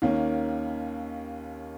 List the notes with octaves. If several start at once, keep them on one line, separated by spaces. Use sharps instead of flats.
D#2 D#3 A#3 C#4